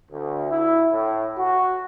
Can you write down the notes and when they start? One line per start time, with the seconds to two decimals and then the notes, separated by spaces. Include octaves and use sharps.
0.12 D2
0.50 E4
0.92 A2
1.38 F#4